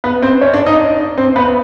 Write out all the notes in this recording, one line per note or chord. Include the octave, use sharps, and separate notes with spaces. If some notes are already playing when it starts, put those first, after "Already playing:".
B3 B4
C4 C5
C#4 C#5
D4 D5
D#4 D#5
D4 D5
C4 C5
B3 B4